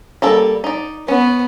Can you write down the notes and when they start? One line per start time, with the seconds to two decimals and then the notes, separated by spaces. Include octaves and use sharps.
0.22 G3 A#3 A4
0.64 D#4 D5
1.08 B3 C#4